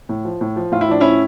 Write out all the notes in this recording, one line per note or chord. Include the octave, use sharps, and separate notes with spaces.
A2
F3
A2
F3
A2 F4
E4
F3 D4
A2 C#4 E4